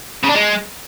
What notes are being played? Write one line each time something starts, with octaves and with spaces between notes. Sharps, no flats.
C#3
D4
G#3